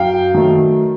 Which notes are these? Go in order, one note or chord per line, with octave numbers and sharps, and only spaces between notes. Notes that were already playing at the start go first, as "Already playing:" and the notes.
Already playing: F#2 F5 G5
D#3 F#3 A3